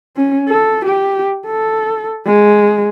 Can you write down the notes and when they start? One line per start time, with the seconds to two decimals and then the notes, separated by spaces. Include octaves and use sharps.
0.16 C#4
0.49 A4
0.85 G4
1.46 A4
2.26 G#3